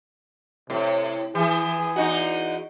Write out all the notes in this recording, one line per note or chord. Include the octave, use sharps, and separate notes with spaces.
A2 C3
E3 G#4
E2 D#4 F#4